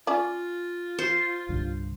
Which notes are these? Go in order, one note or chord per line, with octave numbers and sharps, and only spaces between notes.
C#4 F4 D5
C5
C2 G2 D3